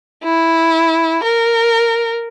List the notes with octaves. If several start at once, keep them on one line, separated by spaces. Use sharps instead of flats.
E4
A#4